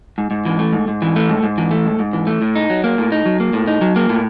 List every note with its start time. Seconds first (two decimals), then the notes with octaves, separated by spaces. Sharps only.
0.18 G#2
0.31 G#2
0.45 E3
0.59 A3
0.73 G#2
0.88 G#2
1.02 E3
1.16 A3
1.29 G#2
1.43 G#2
1.58 E3
1.71 A3
1.85 G#2
1.99 G#2
2.13 E3
2.27 A3
2.42 A2
2.56 D#4
2.70 F#3
2.84 A#3
2.98 A2
3.12 D#4
3.25 F#3
3.40 A#3
3.53 A2
3.67 D#4
3.81 F#3
3.96 A#3
4.09 A2